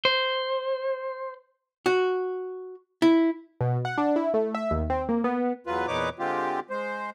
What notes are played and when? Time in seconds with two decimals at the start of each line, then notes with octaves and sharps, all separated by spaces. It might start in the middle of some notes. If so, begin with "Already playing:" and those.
0.05 C5
1.86 F#4
3.02 E4
3.61 B2
3.85 F#5
3.98 D4
4.16 E4
4.34 A3
4.55 E5
4.71 D#2
4.90 C4
5.09 A#3
5.24 B3
5.67 E2 F#3 F4 B4
5.87 E2 A#2 D#4 B4 C#5 D6
6.19 D3 G#3 C4 F4 G4
6.70 G#3 C5